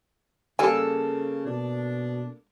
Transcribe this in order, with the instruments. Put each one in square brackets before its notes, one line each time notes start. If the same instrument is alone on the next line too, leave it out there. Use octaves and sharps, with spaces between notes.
[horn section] C#3 [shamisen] G3 G#5 [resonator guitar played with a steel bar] A#3 A4
[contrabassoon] B2 [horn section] D4